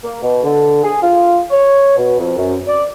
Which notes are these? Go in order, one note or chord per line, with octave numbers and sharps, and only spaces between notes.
A#3
B2
D3
G#4
F4
C#5
B2
F2
F#2
D5